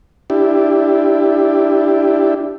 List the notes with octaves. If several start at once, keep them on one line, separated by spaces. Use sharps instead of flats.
D4 E4 G4